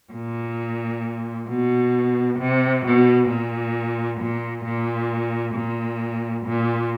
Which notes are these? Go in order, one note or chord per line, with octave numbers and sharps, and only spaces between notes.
A#2
B2
C3
B2
A#2
A#2
A#2
A#2
A#2